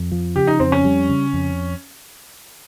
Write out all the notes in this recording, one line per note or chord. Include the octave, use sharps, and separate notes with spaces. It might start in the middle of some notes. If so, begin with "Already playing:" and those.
Already playing: F2
F3
C#3 G4
D#4
F2 C4
C#4
G3
C#3
F2